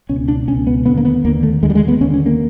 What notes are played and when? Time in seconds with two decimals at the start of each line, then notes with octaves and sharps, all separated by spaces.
0.09 C#2 B2 C#4
0.28 D4
0.48 C#2 C#4
0.51 B2
0.67 B3
0.86 D#2 D3 B3
0.97 A#3
1.05 B3
1.25 D#2 D3 A#3
1.43 A3
1.63 D#2 D3 G#3
1.70 G3
1.75 G#3
1.88 B3
2.01 D#2 D3 C#4
2.14 C#4
2.26 A#3